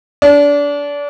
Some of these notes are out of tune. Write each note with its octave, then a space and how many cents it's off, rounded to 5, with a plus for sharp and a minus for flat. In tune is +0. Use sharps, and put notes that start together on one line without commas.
D4 -25